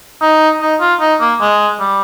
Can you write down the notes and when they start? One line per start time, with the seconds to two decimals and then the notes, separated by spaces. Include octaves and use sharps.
0.21 D#4
0.61 D#4
0.81 F4
1.01 D#4
1.20 A#3
1.41 G#3
1.80 G3